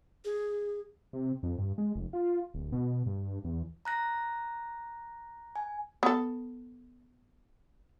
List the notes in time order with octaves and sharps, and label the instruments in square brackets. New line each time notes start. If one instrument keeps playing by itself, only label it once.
[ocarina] G#4
[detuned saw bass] C3
F2
G2
G#3
F1
F4
D1
B2
G2
E2
[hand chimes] A#5 F#6 A#6
G#5
[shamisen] B3 A4